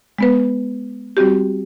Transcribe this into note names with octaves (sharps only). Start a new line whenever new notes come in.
G#3 B3 B4
G3 C4 F#4 G4